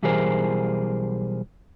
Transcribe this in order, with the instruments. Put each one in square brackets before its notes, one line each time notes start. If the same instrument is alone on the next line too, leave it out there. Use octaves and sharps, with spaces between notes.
[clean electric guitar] B1 E3 G3 G#4 A#4 C5